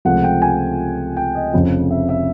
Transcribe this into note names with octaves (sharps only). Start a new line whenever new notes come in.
C#2 C3 F3 A3 F#5
G5
G#5
G5
D#5
F1 F2 C#3 F3
E5
E5